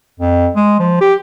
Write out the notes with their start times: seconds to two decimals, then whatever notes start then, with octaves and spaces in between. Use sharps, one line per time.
0.19 F2
0.56 G#3
0.79 F3
1.01 G4